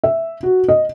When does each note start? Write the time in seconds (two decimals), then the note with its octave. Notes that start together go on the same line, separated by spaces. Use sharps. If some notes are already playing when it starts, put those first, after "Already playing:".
0.04 E5
0.43 F#4
0.68 D#5